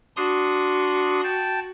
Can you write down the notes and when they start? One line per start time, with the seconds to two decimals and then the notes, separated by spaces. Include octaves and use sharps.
0.17 D4 F#4 C6 D#6
1.24 G5 A5